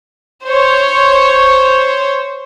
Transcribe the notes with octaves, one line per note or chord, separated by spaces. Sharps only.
C5 C#5